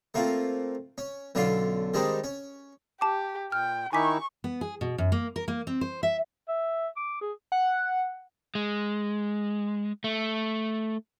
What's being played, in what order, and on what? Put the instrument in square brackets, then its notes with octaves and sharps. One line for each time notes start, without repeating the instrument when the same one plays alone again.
[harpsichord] A3 A#3 C4 F4
C#4
B1 D3 C#4 D4 F4 C6
D#3 G3 G#3 C4 D4 D#4
C#4
[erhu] G4 [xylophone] A5 D6
[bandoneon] A#2 [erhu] G5 [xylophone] F6
[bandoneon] D#3 D#4 E4 [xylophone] G#5 D6 B6 [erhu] C#6
[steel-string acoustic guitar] B3
G#4
B2
F#2
A#3
A#4
A#3
C4
C5
E5
[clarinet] E5
D6
G#4
[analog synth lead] F#5
[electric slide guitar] G#3
A3